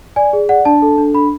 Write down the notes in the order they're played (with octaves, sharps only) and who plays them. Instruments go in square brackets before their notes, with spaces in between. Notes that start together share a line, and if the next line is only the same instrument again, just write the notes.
[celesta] D5 G#5
G#4
D5 F#5
D4 A5
A4
D4
D4 B5